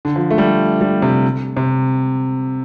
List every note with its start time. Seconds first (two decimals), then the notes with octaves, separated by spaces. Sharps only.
0.05 D3
0.16 F3
0.31 A3
0.38 G3
0.81 G3
1.02 C3
1.57 C3